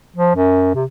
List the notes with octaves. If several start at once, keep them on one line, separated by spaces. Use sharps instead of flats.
F3
F#2
C3